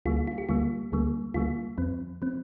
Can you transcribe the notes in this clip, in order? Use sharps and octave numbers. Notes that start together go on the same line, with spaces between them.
D2 D3 G3 A#3 F4
F4
G4
D2 D3 G3 A#3 F4
D2 D3 G3 A#3
D2 D3 G3 A#3 F4
F2 F3 C4
F3 C4